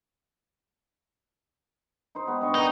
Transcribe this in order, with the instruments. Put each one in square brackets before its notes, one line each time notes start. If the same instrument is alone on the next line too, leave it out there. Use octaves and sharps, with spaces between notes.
[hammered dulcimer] D#4 C5
G#3 B3 G4
G2 D#5 C#6
[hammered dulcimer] D#3 [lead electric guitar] D#4